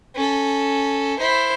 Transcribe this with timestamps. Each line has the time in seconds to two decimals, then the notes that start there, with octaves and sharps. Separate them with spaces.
0.15 C#4 A4
1.20 E4 C5